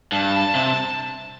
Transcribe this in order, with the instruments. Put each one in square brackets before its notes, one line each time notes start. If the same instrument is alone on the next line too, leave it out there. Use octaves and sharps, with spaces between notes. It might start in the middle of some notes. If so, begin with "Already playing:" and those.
[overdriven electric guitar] G2 [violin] A5
[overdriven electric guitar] C3